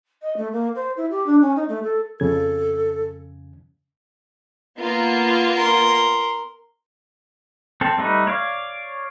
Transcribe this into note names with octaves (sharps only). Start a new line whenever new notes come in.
D#5
A3
A#3
C5
E4
G4
D4
C#4
D#4
A3
A4
F2 C#3 A4 G#6
A#3 B3 F4
A#4 C6
C4 A4
G3 A3 D#4 B4
C#5 D5 F5